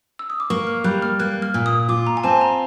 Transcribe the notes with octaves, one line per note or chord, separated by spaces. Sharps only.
E6
D#6
D6
A#3 C#6
F6
G3 F#6
F6
A#3 F#6
F6
A#2
D#6
F4 D6
A#5
G#5
C4 A5
A#5